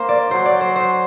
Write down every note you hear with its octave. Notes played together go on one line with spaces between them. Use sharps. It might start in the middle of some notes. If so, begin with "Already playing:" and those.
Already playing: A#3 C5
D5
F#3 C5
D5
C5
C5